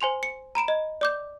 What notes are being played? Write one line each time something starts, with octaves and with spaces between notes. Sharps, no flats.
C5 G#5 C6 F7
C#7
A#5 B5 D7 E7
D#5
D5 D6 G6